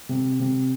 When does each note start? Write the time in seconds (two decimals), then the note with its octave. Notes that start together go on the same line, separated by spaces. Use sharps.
0.09 C3
0.40 C3